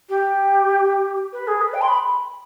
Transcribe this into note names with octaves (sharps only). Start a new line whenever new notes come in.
G4
B4
G#4
B4
G5
C6
B5